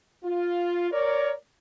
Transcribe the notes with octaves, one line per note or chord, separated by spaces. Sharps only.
F4
A#4 C#5 D5